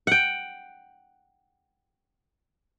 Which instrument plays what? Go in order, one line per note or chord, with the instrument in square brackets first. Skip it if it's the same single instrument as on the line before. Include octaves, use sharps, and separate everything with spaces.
[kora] F#5 G5